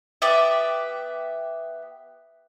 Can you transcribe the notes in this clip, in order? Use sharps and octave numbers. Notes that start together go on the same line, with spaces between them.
B3 G4 D5 E5